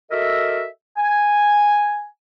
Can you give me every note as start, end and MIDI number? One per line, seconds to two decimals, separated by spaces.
0.11 0.67 66
0.11 0.67 69
0.11 0.67 70
0.11 0.67 75
0.11 0.67 76
0.98 2.07 80